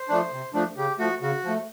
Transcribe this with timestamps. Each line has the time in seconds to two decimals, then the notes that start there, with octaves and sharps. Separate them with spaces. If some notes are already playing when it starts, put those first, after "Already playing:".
Already playing: C5
0.09 F3 A3 D4
0.32 C3
0.54 F3 A3 D4
0.77 C#3 G4
0.99 F3 A3 F#4
1.21 C#3 F#4
1.44 F3 A3